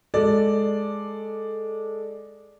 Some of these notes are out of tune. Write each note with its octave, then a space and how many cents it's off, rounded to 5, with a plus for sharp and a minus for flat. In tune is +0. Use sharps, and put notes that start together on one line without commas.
G#3 +0 A4 +0 D5 +0